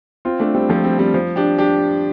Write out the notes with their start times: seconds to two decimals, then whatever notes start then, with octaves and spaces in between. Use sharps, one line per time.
0.25 C4 F4
0.40 A3 D4
0.55 G3 C4
0.69 F3 A3
0.84 G3 C4
0.99 G3 C4
1.14 F3
1.36 D4 G4
1.58 D4 G4